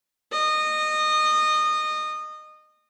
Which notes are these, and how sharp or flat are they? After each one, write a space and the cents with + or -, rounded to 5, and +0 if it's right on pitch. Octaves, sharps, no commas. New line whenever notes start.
D#5 -20